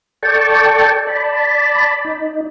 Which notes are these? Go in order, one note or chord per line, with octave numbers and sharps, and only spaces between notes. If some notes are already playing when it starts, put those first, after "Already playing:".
A4 D5 G5 A5 C#6
D5 A5 B5
D#4